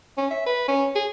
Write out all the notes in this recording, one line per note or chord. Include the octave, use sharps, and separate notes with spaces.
C#4
E5
B4
C#4
G#4